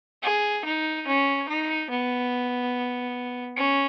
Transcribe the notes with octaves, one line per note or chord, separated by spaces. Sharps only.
G#4
D#4
C#4
D#4
B3
C#4